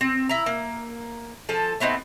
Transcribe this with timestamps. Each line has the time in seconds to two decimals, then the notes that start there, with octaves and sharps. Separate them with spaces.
0.01 C4
0.29 E4 A#5
0.46 A#3
1.49 F3 A4 G#5
1.80 A3 B3 C4 D#4